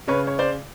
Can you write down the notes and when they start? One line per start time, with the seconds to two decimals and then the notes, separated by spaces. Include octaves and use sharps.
0.07 C#3 B4 C#5
0.27 C#5
0.39 C5 D5